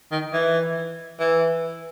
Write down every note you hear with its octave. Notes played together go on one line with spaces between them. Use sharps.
D#3
E3
E3